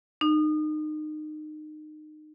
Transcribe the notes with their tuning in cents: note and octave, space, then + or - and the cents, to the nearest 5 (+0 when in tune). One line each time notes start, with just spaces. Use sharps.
D#4 -25